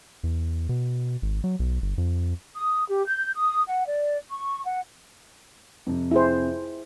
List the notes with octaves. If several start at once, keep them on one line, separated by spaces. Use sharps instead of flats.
E2
B2
G#1
F#3
B1
G1
F2
D#6
G4
G6
D#6
F#5
D5
C#6
F#5
F2 C3
E4 G#4 C5